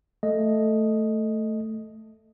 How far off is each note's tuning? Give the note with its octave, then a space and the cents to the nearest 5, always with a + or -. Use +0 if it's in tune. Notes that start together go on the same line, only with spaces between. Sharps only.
A3 +0 A4 +0 D#5 +0